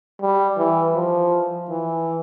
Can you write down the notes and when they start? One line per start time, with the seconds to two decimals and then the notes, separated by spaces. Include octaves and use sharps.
0.21 G3
0.58 E3
0.95 F3
1.69 E3